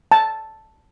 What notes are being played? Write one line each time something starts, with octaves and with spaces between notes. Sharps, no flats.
A5